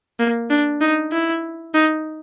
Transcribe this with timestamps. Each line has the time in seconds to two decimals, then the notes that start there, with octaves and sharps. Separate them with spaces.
0.20 A#3
0.50 D4
0.81 D#4
1.12 E4
1.74 D#4